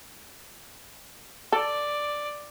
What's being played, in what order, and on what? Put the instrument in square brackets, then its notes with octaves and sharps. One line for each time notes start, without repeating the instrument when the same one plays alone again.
[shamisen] A4 [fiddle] D5